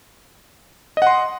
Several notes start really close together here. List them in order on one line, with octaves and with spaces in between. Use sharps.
D#5 F#5 C6